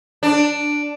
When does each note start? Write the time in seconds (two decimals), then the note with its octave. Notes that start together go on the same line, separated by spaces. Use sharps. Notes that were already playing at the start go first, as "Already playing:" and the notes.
0.23 D4